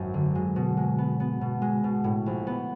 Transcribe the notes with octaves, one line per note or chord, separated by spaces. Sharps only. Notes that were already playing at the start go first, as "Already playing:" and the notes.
Already playing: G#1 F#2
D3
G#3
B2
G#3
B3
B3
B2
G#3
B2
A2
A#1
B3